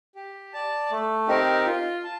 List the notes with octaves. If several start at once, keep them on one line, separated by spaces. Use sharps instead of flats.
G4
D5 A5
A3
C4 D#4 G4 A#4
F4
A5